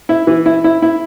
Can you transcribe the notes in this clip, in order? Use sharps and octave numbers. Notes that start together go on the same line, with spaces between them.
E4
E3
E4
E4
E4